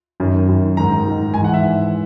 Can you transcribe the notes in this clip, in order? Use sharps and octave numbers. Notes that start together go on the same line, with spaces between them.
F#2 D#3
F#2 D#3
G#2 D#3 A#5
G#2 D#3
G#2 E3 G#5
F#5
E5
G#2 E3